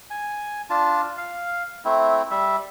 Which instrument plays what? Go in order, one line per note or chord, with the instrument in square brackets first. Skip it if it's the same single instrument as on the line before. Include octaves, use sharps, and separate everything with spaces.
[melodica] G#5
D4 F4 A5
F5
A3 C4 E4
G3 E5